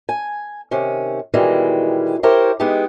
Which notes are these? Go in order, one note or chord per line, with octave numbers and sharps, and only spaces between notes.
G#5
C3 D#3 C#4
B2 D#3 E3 G3 G#3
E4 G4 A#4 C5 C#5
G#3 B3 D#4 E4 G4